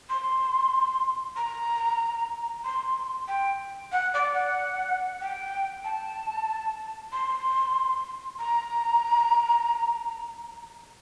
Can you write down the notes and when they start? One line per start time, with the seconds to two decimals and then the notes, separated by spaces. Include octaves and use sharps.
0.10 C6
1.36 A#5
2.64 C6
3.28 G5
3.92 F#5
4.14 D5
4.34 F#5
5.21 G5
5.84 A5
7.12 C6
8.39 A#5